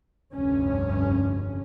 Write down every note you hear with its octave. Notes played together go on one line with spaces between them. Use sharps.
F1 D2 G2 C#4